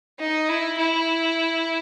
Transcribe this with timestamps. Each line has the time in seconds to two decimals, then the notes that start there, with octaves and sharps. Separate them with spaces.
0.19 D#4
0.49 E4
0.78 E4